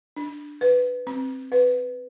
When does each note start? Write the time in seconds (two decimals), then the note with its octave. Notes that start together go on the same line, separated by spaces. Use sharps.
0.16 D4
0.61 B4
1.07 C4
1.52 B4